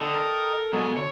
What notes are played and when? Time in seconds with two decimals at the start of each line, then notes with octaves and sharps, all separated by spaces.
0.01 D3 A4 D#5 G5 A5
0.14 A#4
0.73 B2 F#3 G#3 G#5
0.97 D3 C#5